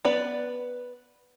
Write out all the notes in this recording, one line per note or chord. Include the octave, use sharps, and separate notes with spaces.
B3 B4 D5